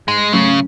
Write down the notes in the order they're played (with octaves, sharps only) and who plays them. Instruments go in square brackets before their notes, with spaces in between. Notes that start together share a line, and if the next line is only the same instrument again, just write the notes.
[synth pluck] G#2 [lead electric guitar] G#3
[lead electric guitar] C#3 [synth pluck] F#3 A3 C#4